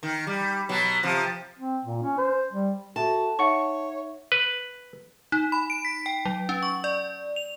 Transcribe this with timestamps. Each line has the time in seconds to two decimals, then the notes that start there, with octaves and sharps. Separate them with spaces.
0.03 D#3
0.27 G3
0.69 B2 F#3
1.03 C3 F3
1.59 C4
1.84 A#2
2.03 C#4
2.18 C5
2.53 G3
2.96 F#4 A4 E5 A5
3.39 D#4 C#5 E5 F#5 C#6
4.32 B4
5.32 D#4
5.52 B5
5.70 D7
5.85 B6
6.06 G5
6.25 F#3
6.49 C#4
6.63 C#6
6.84 D5
7.36 F7